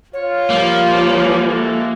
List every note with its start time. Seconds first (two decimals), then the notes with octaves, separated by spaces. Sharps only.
0.13 F4 C#5
0.50 F3 G3 A#3
1.50 G#3 F#4 A4 E5